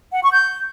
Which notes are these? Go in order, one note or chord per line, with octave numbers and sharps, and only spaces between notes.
F#5
C#6
G6